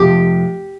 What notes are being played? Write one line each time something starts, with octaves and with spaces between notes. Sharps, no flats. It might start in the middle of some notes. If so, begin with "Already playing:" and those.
Already playing: F1 F2 C3 F3 G4